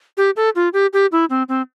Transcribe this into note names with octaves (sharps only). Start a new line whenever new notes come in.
G4
A4
F4
G4
G4
E4
C4
C4